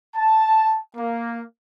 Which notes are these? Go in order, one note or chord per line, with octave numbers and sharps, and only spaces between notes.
A5
A#3